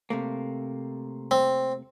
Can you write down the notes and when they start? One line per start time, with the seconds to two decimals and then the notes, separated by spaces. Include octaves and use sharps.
0.10 C3 A3 A#3
1.31 C4